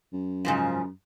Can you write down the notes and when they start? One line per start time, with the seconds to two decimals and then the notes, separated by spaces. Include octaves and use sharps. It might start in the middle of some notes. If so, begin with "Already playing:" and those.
0.13 F#2
0.45 G#2 C#3 F3